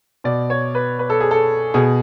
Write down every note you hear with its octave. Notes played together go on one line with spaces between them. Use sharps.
B2 D5
C#5
B4
B4
A4
G#4
A4
B2 G#4